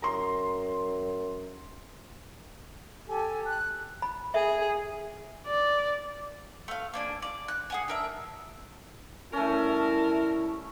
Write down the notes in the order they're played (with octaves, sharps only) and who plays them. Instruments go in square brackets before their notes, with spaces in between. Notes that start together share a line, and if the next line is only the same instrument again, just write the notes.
[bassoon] F#2 [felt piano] A#5 C6
[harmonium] G4 A4 [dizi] G#5
[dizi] F#6
[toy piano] B5
[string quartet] G#4 [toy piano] E5
[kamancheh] D5
[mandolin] A3 F5
A#3 D4 G#5
D5
F#6
G#4 F#5 G#5
D4 A#4 E5
[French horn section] A#2 G3 E4 [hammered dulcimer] A3 C#4 [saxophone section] A#4 [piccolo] A5